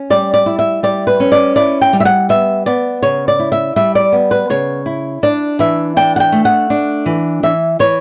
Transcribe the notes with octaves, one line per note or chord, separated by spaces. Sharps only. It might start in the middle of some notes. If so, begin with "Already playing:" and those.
Already playing: C#4
G3 D5
D5
E4
E5
G3 D5
B4
C#4
D5
E4 D5
G5
G3
E5
F#5
B3 E5
B3 D5
C#3 C#5
D5
E4
E5
G3 E5
D5
B3
B4
C#3 C#5
E4
D4 D5
E3 E5
D4 G5
F#5
G5
A3
F#5
D4
E3
E3 E5
E3 C#5